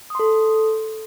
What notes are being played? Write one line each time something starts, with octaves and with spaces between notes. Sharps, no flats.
A4 C6 D#6